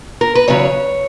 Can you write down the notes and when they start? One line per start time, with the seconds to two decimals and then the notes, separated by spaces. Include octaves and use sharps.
0.21 A#4
0.35 B4
0.48 E2 C#3 F#3 C#5